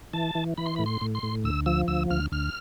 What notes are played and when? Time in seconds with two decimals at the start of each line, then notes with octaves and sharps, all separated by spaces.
0.13 E3 A5
0.35 E3
0.58 E3 B5
0.66 C6
0.76 A2 B5
0.86 C6
1.01 A2
1.15 C6
1.23 A2
1.44 D2 E6
1.66 F3 E6
1.88 D2 E6
2.10 D2 F6
2.32 D2 F6